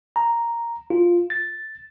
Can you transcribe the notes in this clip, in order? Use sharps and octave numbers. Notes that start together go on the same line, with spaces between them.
A#5
F4
A6